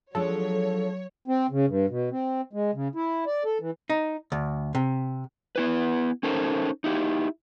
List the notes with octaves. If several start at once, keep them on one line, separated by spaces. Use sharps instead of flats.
F3 F#3 G#3 D4 A4 C#5
C4
C#3
G2
B2
C4
G#3
C#3
E4
D5
A4
E3
D#4
D2
C3
B3 E4 B4
C#4 D#4 A4 A#4 C5
D#4 E4 G4